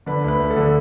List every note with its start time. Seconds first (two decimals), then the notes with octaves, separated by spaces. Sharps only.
0.06 D3 B4
0.24 D2 B4
0.40 D2
0.50 A4
0.56 D3